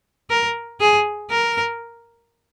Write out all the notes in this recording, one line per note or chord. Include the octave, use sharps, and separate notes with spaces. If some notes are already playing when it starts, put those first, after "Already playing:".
A#4
G#4
A#4